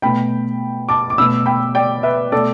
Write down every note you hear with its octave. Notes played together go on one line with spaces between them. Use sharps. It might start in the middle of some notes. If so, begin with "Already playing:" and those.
B2 A3 G5 B5
A5 D6
D6
B2 A3 B5 E6
G5 B5
D5 G5
B4 E5
B2 A3 A4 D5